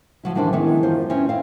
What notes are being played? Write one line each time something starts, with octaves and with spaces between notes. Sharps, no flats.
F3 F#3 E4
D#3 E3 G3 D4 G4 C5
D#3 E3 G#3 B3 C#4 E4
F#2 F4 C5
C4 C#4 E4 B4 C5
C4 F5